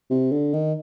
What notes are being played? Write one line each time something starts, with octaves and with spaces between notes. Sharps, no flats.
C3
D3
D#3